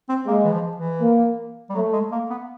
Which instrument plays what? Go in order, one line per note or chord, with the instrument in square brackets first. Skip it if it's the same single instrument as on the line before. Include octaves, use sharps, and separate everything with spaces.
[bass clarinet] C4
[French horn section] G#3 [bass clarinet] A#3
[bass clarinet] E3
F3
E3
[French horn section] A#3
[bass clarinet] G3
[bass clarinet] F#3 [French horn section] A3
[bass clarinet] G#3
A#3
B3